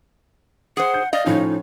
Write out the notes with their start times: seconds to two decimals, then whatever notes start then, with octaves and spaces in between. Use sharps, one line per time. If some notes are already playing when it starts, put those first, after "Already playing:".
0.77 G#4 C5 F#5
0.94 G6
1.13 D5 D#5 F5
1.26 A2 F3 C#4 D#4